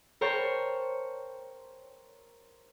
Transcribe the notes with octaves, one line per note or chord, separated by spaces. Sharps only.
A#4 C5 C#5 G5 A5